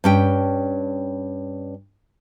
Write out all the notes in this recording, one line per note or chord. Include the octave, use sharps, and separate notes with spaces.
G2 C#4 G5